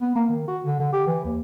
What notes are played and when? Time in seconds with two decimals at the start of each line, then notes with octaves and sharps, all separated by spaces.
0.02 B3
0.15 A#3
0.29 D#3
0.48 F#4
0.65 D3
0.80 D3
0.93 G4
1.07 E3
1.25 D#2